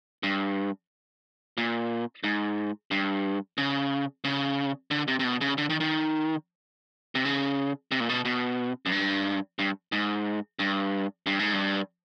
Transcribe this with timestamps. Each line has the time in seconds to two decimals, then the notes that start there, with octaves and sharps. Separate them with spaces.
0.23 G2
1.57 A#2
2.24 G#2
2.91 G2
3.58 C#3
4.24 C#3
4.91 D3
5.08 C3
5.19 C3
5.24 B2
5.41 C#3
5.58 D3
5.70 D#3
5.80 D#3
7.15 C3
7.25 C#3
7.92 C3
8.00 A#2
8.09 B2
8.25 B2
8.86 F#2
8.92 G2
9.59 G2
9.92 G#2
10.59 G2
11.26 G2
11.39 G#2
11.53 G2